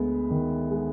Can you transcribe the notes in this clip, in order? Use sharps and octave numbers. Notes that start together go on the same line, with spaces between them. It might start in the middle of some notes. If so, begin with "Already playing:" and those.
Already playing: D2 G#3 B3
D#3
G#3